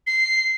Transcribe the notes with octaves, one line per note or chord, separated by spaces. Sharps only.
C7